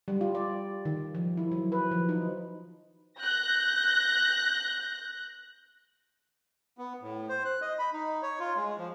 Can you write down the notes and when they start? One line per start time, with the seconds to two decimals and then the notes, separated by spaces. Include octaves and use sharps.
0.08 G3
0.21 F4
0.35 D5
0.85 D#3
1.14 F3
1.37 E4
1.52 F#3
1.72 B4
1.91 F3
2.09 D#4
3.21 F#6 G6 A#6
6.78 B3
7.01 A2
7.29 C5
7.45 F#6
7.62 D#5
7.79 B5
7.93 D#4
8.22 C#5
8.40 F4
8.56 G#3
8.78 F3